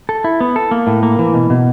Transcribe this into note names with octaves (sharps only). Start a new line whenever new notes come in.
A4
E4
B3
A4
A#3
A2
A#3
E3
B2
B2